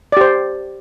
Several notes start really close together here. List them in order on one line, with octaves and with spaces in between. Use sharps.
D5 G4 C5